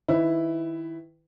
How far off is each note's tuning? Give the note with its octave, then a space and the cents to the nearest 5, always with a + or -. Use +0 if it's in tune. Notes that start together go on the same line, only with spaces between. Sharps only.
D#3 +10 E4 +0 B4 +20